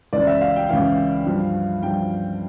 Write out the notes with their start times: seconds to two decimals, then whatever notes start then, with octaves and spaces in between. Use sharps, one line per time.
0.13 C#2 C#3 E3 D5
0.27 E5
0.41 F5
0.56 G5
0.69 C#2 C#3 E3 F5
1.26 G2 F3
1.83 G2 F3 G5